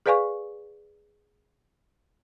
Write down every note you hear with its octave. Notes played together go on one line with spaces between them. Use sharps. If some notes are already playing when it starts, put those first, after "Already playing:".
G#4 B4 D5 F5 G#5 C#6